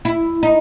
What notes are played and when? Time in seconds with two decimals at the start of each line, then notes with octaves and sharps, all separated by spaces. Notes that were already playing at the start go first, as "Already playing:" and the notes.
0.05 E4
0.43 D#4